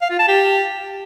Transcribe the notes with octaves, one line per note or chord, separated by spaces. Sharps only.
F5
F4
A5
G4